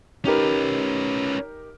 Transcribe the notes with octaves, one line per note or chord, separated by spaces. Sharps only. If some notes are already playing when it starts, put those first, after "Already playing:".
C#4 D#4 G4 A#4 B4